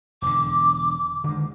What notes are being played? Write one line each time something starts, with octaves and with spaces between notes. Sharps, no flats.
E1 D3 D6
D3 D#3 G#3